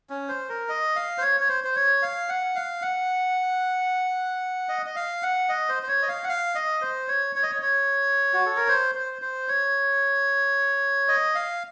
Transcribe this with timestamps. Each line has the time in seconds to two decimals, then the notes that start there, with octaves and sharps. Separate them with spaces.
0.10 C#4
0.29 C5
0.49 A#4
0.69 D#5
0.96 F5
1.18 C5
1.22 C#5
1.40 C#5
1.49 C5
1.64 C5
1.76 C#5
2.02 F5
2.29 F#5
2.55 F5
2.82 F#5
4.69 D#5
4.86 D#5
4.96 F5
5.23 F#5
5.49 D#5
5.69 C5
5.83 C5
5.88 C#5
6.02 D#5
6.08 F5
6.24 F#5
6.29 F5
6.55 D#5
6.82 C5
7.08 C#5
7.36 C#5
7.43 D#5
7.51 C#5
7.62 C#5
8.34 F#4
8.46 A4
8.56 A#4
8.68 C5
8.95 C5
9.22 C5
9.48 C#5
11.08 D#5
11.35 F5